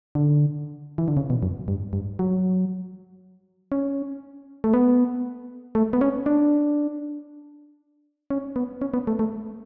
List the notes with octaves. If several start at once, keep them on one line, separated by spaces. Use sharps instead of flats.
D3
E3
D3
C#3
B2
F#2
G2
G2
F#3
C#4
A3
B3
A3
B3
C#4
D4
C#4
B3
C#4
B3
A3
A3